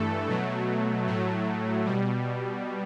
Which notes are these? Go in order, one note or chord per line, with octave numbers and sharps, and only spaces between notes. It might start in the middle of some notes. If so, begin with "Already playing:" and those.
Already playing: G2 E3 A3 A4
B2 F#3 A3
A2 F#3 A3
B2 G3